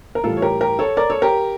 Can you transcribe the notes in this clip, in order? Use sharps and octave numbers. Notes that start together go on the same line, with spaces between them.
A#4
A2 E3 G3 F4 A4
C#5
G4 A#4
G4 A#4
A4 C#5
A#4 D5
A4 C#5
G4 A#4